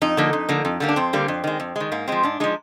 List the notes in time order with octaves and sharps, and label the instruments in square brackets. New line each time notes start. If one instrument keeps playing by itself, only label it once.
[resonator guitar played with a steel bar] F2 D#4
D3 F3 A#3
F2
D3 F3 A#3
F2
D3 G3 A#3
D4
F2 C4
D3 G3 A#3
F2
D#3 G#3
F2
D#3 G#3
G#2 A#3
F3 G#3 C4
G#2 D4
F3 G#3 D#4